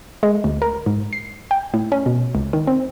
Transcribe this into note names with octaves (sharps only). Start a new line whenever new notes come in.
G#3
D2
A#4
G#2
C7
G5
A2
C#4
B2
C#2
D#3
C4